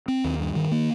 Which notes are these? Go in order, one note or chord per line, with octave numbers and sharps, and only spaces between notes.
C4
D#2
G2
D#3
A#3